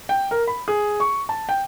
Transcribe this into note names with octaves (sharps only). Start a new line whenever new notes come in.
G5
A#4
B5
G#4
C#6
A5
G5